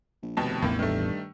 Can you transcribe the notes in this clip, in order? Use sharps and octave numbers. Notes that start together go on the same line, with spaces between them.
A#1
F1 D#2 B2 A5
A1 E2 A2 A#3
G2 D#3 A3